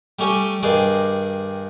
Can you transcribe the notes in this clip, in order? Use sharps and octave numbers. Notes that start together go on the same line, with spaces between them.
G3 A3 C#4 G4 G#5
G2 D#3 G#4 C5 D5